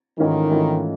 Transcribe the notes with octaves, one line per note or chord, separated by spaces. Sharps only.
G#2 D#3 E3 A3 C#4 F4
G#2 E3 A3 C#4 F4